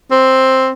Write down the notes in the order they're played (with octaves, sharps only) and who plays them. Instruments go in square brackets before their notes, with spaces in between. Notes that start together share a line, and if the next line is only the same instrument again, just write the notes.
[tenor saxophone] C4